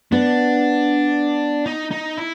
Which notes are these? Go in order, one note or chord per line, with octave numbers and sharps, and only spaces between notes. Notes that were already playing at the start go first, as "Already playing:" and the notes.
B3 D4
D#4
D#4
E4